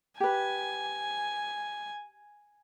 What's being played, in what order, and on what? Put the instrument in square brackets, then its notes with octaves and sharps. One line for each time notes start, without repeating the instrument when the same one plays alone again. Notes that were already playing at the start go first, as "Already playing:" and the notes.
[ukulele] G4 B4 [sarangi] G#5